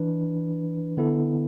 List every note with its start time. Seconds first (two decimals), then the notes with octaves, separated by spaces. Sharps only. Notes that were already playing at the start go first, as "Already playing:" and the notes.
Already playing: E3 D4 B4
0.97 D3 B3 E4 A4